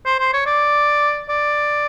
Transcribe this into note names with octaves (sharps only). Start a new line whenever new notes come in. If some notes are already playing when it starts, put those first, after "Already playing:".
C5
C5
C#5
D5
D5